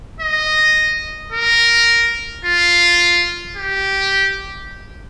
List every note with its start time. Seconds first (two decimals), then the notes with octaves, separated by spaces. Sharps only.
0.21 D#5
1.32 A#4
2.45 F4
3.56 G4